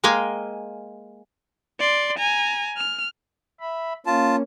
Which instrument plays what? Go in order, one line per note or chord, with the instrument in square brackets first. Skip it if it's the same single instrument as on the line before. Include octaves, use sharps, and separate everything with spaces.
[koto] G#3 A#3 F5 G5 G#5
[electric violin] D5 C6
G#5 A#5
F6
[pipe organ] E5 B5
[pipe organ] A#3 C#4 [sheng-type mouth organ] F4 A5